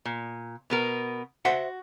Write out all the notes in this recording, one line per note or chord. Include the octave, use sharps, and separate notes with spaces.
A#2
B2 B3 A#4
F#4 C5 E5 F#5